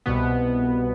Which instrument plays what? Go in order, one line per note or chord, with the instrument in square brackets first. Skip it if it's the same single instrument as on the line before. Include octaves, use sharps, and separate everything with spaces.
[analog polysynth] C2 B2 B3